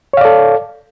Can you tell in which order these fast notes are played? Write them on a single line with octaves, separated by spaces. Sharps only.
C#5 F5 D5 A4